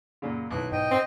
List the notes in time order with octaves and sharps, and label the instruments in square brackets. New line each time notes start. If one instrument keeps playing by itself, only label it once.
[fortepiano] F#2 A#2 C#3
[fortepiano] B1 E4 [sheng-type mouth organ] F#6
[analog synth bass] G#2 [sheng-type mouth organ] D#5 G5
[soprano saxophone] C4